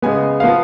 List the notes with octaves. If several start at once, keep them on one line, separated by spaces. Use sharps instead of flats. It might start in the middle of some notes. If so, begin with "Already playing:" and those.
C#3 G#3 B3 G#5
F3 B3 F5